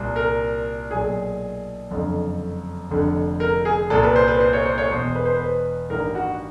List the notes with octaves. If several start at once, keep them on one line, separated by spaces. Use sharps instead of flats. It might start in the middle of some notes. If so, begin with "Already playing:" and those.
Already playing: C2 A#2
A#4
B1 A#2 G#4
F#1 F2 D3
F1 F2 D3
A#4
G#4
C2 A#2 A4
B4
C5
B4
C5
C#5
C5
C#5
E1 E2 B2 C5
B4
C5
B4
A1 G2 D#3 A#4
F#4